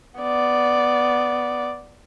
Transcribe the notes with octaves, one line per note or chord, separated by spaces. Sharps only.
B3 D5